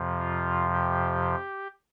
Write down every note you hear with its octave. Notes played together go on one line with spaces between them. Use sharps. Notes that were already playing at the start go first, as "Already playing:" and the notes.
Already playing: F2 C3 F3
F4
G4